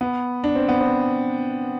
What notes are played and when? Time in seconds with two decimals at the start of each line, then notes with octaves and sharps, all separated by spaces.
0.01 B3
0.44 D4
0.55 C4
0.68 B3
0.81 C4